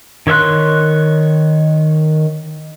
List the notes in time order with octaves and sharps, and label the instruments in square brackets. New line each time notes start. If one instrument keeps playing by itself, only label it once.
[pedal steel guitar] D#3 C#5 E5 C6 F#6